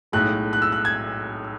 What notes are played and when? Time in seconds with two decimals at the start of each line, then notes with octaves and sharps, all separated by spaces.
0.12 B1 A2 G#3 F#6
0.53 F#6
0.62 E6
0.72 F#6
0.85 G#6